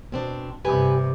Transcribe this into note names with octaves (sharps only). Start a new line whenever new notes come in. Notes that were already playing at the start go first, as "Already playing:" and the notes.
B2 C4 D4
G2 C3 G4 B4 G#5